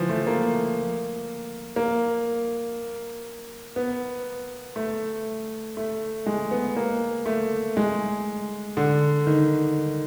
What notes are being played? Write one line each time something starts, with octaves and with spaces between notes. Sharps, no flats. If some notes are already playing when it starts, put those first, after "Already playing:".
Already playing: E3 F3
A3
A#3
A#3
B3
A3
A3
G#3
B3
A#3
A3
G#3
D3
D#3